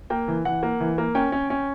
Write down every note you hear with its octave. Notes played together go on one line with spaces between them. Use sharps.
A#3 G5
E3
E3 F#5
A#3
E3
A#3
C#4 G5
C#4
C#4